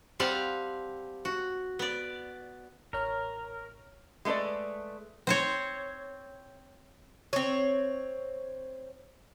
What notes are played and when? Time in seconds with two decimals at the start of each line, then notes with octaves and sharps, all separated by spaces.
0.20 G3 C4 G4 F5 F#5 A5
1.25 F#4
1.79 B3 D5
2.93 A1 A#4 C#5 F6
4.25 G#3 A3 A4 B4 D5
5.27 C4 C5 C#5
7.33 C4 C#5